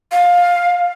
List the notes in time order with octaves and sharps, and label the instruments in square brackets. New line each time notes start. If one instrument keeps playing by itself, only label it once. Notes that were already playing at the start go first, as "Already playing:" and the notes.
[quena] F5